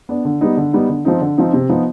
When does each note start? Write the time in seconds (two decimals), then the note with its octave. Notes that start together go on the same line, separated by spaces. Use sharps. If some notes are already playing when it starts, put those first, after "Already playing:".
0.09 B3 D4
0.25 D3
0.41 G3 B3 D#4
0.57 D3
0.73 G3 B3 D#4
0.89 D3
1.05 F3 C4 D#4
1.21 D3
1.37 F3 C4 D#4
1.53 C3
1.69 F3 B3 D#4